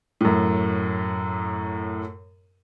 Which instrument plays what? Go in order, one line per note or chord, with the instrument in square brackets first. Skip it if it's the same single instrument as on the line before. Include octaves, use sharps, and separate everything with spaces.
[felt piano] F#2 A2